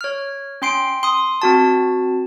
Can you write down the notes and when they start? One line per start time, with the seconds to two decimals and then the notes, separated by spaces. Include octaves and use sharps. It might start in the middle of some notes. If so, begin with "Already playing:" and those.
0.01 C#5 F6
0.62 C#4 G5 C6 C7 D7
1.03 C6 D#6
1.42 C4 F#4 A5